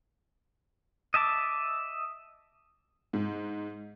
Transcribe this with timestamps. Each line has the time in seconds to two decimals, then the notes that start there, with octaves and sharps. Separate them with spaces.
1.14 D#5 E5 A5 D6
3.13 G#2